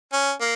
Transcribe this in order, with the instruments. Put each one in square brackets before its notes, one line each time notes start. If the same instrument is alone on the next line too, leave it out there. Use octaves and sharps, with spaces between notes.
[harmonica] C#4
A#3